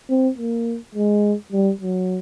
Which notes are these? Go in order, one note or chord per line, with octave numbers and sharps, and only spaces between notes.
C4
A#3
G#3
G3
F#3